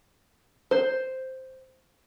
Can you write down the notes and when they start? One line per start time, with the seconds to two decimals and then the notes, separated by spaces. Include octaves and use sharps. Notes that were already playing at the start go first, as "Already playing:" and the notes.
0.71 C5